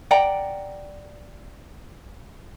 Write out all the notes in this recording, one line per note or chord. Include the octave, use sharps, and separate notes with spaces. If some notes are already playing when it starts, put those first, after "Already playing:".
D5 F#5 G5 A#5